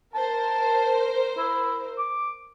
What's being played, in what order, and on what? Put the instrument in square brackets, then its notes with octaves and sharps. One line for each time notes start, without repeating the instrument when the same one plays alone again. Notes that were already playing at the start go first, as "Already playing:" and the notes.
[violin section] A#4 C5 [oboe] A5
[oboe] E4
D6